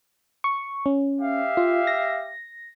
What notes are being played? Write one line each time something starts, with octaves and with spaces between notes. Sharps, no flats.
C#6
C#4
G4 E5 F5
F4
A#6